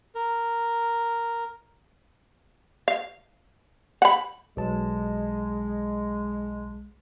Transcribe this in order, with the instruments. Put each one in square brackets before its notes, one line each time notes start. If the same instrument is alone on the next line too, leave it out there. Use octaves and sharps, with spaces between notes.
[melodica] A#4
[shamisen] F5
F#5 B5
[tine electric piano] B1 A5 [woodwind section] G#3